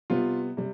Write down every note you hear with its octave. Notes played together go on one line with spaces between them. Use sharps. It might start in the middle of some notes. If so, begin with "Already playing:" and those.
C3 G3 B3 F4
C3 G3